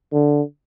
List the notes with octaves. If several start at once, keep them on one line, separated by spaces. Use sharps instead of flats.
D3